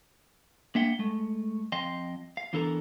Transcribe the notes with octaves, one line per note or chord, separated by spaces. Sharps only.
A#3 D4 E5 F#5 G5
G#3 A3
F2 D#5 F5 G5 C6
F5
E2 E3 D4 A4 A#4 A#5